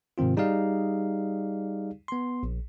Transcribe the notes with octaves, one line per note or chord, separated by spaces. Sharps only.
G#2 C3 D#3 C4 F4
G3 D#4 G4 G#4 D5 F5
B3 C6
A#1